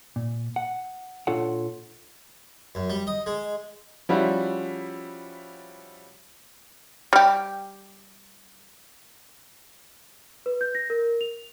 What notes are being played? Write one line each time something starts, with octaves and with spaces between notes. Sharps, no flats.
A#2
F#5
A#2 D4 F4 A4 C#5 F#5
F#2
G3
D#5
G#3
F3 G3 C#4 E4 F#4
G3 G4
B4
G6
A#6
A#4
F7